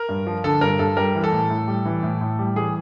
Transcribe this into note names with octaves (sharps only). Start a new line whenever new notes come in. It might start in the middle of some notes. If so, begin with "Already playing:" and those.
Already playing: A#4
G2
F3
D3 A4
G2 A#4
G2 A4
G3 A#4
E3
A4
A2
A2
G3
E3
A2
A2
G3
E3 G#4